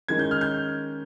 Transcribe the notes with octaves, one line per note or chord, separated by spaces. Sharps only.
D#3 G#3 C#4 G#6
G6
F6
G6